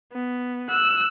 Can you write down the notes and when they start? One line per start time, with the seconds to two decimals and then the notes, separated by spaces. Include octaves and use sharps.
0.13 B3
0.69 E6 F#6